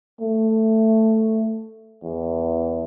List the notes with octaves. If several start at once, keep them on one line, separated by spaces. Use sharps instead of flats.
A3
E2